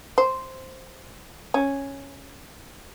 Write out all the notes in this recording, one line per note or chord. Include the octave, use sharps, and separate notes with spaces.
C5
C#4